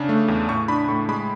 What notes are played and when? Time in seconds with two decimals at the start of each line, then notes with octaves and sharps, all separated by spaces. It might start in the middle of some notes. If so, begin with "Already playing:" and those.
Already playing: C#3 D4
0.09 A3
0.28 E2
0.49 A2 C#6
0.68 D4 B5
0.88 A2 C#6
1.09 G#3 B5